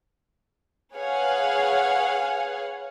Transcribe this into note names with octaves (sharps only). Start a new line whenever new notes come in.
G#4 B4 C#5 F5 F#5 G#5